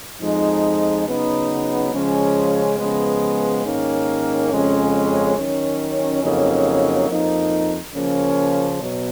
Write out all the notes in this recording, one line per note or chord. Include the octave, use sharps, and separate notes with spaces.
F2 F3 G#3 D#4
C#3 F#3 B3 D#4
C#3 F3 G#3 C#4
C#3 F3 G#3 B3
G#2 D#3 A#3 C#4
F2 C#3 G#3 C#4
D#3 F#3 C#4
F2 C#3 F#3 A#3 D#4
F2 F3 A#3 D#4
C#3 F3 A#3 C#4
B2 F#3